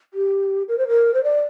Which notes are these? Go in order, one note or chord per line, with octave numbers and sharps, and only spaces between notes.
G4
A#4
C5
A#4
C5
D5